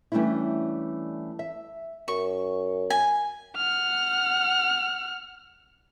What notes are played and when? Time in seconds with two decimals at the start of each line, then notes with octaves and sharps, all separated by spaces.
0.12 E3 G3 A3 C#4 D4 E4
1.39 E5
2.08 F#2 C#6
2.90 G#5
3.57 F#5 F6